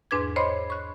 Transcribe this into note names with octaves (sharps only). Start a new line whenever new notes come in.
E2 G#2 D4 B4 D6 G#6
C5 C#5 D#5 B5 C6
C#6 F#6